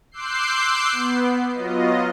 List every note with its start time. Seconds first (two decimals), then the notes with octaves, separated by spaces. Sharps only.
0.11 C6 D6 E6 F#6 G6 C7
0.92 B3
1.54 F#3 B3 F4 D#5